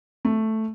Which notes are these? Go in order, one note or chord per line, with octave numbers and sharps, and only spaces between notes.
A3